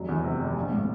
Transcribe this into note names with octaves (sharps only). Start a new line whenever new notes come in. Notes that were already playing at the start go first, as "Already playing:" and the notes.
Already playing: F1 F#3
E2
C3
F1
A#1
A2